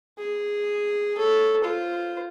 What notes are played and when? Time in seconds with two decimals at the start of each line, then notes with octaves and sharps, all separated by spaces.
0.18 G#4
1.18 A4 C#5
1.64 F4 C5